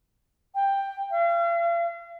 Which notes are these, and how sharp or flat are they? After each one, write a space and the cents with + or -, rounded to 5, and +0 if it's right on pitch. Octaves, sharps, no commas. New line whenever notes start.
G5 +10
F5 -40